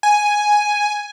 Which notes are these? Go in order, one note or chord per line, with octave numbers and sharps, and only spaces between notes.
G#5